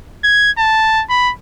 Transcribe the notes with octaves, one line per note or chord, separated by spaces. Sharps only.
G#6
A5
B5